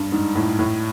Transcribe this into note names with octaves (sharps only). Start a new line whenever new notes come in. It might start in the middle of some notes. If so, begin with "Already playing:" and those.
Already playing: G2
G#2
A2
A2